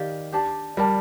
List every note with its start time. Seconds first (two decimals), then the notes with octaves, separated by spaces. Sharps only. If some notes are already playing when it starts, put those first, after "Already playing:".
Already playing: D#3 G4 D5 F5
0.32 D4 G4 D5 A5
0.77 G3 A#4 D5 A5